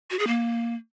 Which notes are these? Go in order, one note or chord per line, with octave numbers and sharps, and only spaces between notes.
F#4
G#4
A#3